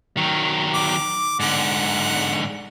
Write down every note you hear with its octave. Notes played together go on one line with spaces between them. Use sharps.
D#3 F#3
D6
G#2 D3 F#5